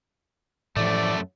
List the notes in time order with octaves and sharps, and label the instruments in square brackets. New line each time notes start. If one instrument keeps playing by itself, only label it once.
[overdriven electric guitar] F#2 A3 [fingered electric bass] A2 E3 F3 [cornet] D5